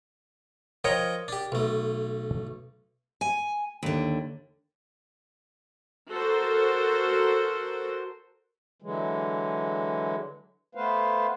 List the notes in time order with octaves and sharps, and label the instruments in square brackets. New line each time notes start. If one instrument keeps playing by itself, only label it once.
[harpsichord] F3 D#5 G5 [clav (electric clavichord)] A#4 C#5
[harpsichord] D4 G4
B1 A3
[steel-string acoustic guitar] G#5
D#2 D3
[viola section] F#4 A4 A#4 C5
[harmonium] D3 E3 F#3 G#3
A3 B3 B4 C5 F5